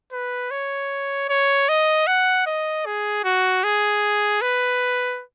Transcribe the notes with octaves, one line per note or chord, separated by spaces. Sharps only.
B4
C#5
C#5
D#5
F#5
D#5
G#4
F#4
G#4
B4